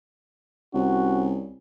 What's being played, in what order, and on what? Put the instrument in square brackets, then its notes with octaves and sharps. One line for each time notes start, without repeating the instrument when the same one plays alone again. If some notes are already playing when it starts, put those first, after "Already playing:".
[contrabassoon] C2 [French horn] C#4 [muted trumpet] F#4